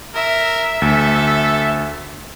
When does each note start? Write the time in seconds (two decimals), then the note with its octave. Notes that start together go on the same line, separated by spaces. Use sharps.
0.14 A#4 E5
0.82 D2 A4